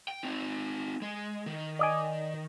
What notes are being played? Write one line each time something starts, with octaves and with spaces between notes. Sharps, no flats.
G5
C4 D#4
G#3
D#3
D5 D#5 G#5